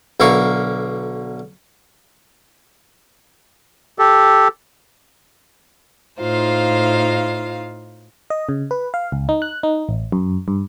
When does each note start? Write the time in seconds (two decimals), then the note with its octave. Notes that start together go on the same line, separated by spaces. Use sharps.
0.20 B1 D3 E4 A#4 F5 C#6
3.99 G4 A4
6.19 A2 D#4 F4 C5 F5
8.30 D#5
8.49 C#3
8.71 B4
8.94 F5
9.12 C#2
9.29 D#4
9.42 F#6
9.63 D#4
9.89 A1
10.12 F#2
10.48 G2